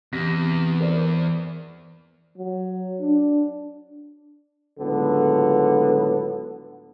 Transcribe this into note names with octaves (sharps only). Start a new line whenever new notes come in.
E2 C3 A#6 B6
A#4 C5 D5
F#3
D4
C#2 A2 D3 F#3 B3